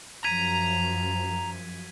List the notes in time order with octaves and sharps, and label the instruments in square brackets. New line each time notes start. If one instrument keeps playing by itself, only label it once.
[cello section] F#2 F3 [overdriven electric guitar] A#5 [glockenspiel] G#6 B6 D#7